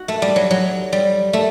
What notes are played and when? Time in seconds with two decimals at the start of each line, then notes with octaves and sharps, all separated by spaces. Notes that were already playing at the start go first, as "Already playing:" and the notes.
Already playing: F#4
0.08 A3
0.22 G3
0.36 F#3
0.51 F#3
0.92 G3
1.33 A3